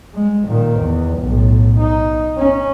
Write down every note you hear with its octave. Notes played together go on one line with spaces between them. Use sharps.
G#3
A#2 D#3
E2
B1 A2
D#4
C#4